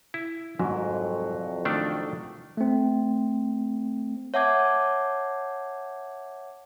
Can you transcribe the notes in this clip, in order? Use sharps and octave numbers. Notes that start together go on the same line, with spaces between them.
E4
C2 F2 G#2 F#3
D#3 A3 D4
A3 C4
C#5 E5 F#5 A5 D6 G#6